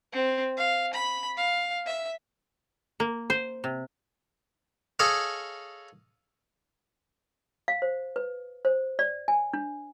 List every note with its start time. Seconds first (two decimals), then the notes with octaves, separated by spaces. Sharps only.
0.13 C4
0.57 F5
0.93 B5
1.37 F5
1.86 E5
3.00 A#3
3.30 C5
3.64 C3
4.99 G#4 A4 C#5 D#5 F5
7.68 F5
7.82 C5
8.16 B4
8.65 C5
8.99 D5
9.28 G#5
9.54 D4